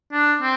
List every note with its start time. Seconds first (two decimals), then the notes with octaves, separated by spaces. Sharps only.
0.13 D4
0.41 C4